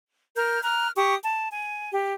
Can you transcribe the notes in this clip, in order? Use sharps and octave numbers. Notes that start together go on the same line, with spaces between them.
A#4 F6 G6
A#5 F6 F#6
G4 C#6 D#6
A5
G#5
G4